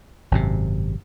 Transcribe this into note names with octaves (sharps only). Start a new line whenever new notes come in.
G#1 F#2 C3